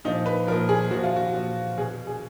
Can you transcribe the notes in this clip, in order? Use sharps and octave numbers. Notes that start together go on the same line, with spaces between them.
A#2 F3 D#4
B4
A#2 F3 A#4
G#4
A#2 F3 F#4
F4
F#4
A#2 F3
B2 G#4
G#4